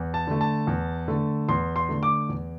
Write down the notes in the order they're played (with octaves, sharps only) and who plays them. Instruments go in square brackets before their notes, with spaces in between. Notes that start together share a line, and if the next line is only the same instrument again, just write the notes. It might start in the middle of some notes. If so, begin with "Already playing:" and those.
Already playing: [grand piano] E2
A5
D3 A3
A5
E2
D3 A3
E2 C6
C6
D3 A3
D6
E2